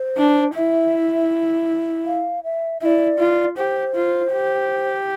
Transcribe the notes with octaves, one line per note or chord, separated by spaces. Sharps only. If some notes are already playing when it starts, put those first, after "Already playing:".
Already playing: C5
D4
E4 E5
F5
E5
E4 D5 E5
F4
G4 C5
F4
G4